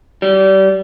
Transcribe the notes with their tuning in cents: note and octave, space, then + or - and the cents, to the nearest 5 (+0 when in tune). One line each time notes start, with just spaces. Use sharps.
G3 -30